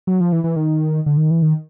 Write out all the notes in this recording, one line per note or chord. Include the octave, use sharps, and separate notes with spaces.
F#3
F3
E3
E3
D#3
D3
D#3
E3
D#3